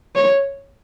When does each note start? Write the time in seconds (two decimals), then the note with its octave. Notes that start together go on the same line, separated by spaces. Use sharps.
0.15 C#5